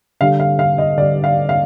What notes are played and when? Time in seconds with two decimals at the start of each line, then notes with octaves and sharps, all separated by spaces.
0.21 D3 G3 F5
0.40 F5
0.59 F5
0.78 D#5
0.97 D3 G3 D5
1.24 F5
1.49 F5